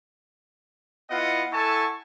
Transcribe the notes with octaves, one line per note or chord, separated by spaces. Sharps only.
B3 E4 F4 D#5 F#5
E4 A4 F#5 G#5 A5 C#6